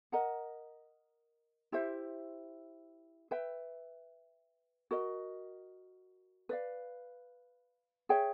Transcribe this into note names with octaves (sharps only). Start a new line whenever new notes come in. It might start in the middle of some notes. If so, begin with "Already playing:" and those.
A#4 D#5 F#5 A#5
E4 G4 C5 E5
B4 E5 G5
F#4 A#4 D#5
B4 D5 F5
G#4 C#5 E5 G5